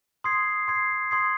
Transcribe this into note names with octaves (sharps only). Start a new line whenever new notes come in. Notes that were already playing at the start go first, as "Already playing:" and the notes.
C6 D#6 G#6 C7
C6 D#6 G#6 C7
C6 D#6 G#6 C7